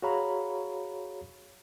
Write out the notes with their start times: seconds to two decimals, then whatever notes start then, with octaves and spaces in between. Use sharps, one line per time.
0.02 F#4 G#4 C#5 F5 A#5 B5